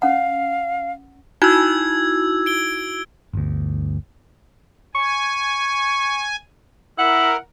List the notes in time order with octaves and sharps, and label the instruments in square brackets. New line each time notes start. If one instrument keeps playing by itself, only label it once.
[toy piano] C#4 F#5 [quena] F5
[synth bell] D#4 E4 F#4 [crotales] E6 G#6
[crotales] D7 G7
[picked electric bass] G1 D2
[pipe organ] G#5 [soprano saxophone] C#6
[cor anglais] E4 [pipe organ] A#4 [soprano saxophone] F#5